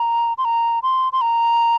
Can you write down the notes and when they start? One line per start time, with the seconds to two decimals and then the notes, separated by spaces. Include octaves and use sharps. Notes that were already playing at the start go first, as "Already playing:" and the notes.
Already playing: A#5
0.38 C6
0.45 A#5
0.83 C6
1.13 C6
1.21 A#5